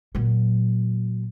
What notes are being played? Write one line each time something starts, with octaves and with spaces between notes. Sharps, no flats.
A#2 F#3